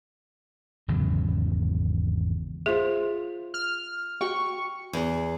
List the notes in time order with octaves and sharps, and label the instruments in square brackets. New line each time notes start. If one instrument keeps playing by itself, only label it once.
[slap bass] G#1 E2 C#3 F#3
[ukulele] F4 C5 E5 [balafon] G#4
[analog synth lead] F6
[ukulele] F#4 G5 [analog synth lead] C#6
[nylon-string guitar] E2